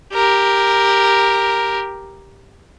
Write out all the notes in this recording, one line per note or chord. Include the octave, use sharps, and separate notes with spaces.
G4 A#4